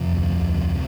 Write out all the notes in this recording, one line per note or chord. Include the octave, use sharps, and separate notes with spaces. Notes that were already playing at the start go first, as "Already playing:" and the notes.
Already playing: F2 C3 F3
D2
D2
C3